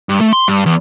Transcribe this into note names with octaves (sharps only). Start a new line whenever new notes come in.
G2
A3
C6
G2
E2